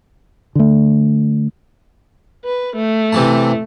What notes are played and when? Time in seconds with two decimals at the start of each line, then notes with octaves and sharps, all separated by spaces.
0.55 D3 A3
2.45 B4
2.76 A3
3.12 C3 E3 A5